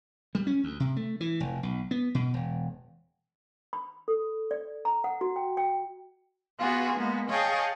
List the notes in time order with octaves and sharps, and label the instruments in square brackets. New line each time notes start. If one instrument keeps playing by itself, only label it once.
[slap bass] G3
C#4
D2
C3
A3
E3
F1
B1
B3
B2
E1
[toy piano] B5
A4
D5
A#5
F#5
F#4
G5
G5
[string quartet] B3 F4 F#4 G#4
G#3 A#3 B3
G#4 C#5 D#5 F5 G5 A5